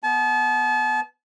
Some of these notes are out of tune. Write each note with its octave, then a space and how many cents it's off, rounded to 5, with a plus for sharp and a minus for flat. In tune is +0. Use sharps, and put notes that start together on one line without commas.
B3 +0 A5 -35